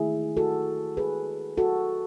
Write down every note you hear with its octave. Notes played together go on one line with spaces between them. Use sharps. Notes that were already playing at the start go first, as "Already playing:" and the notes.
Already playing: D#3 A3 E4 G#4
F#4 A4
G#4 B4
F#4 A4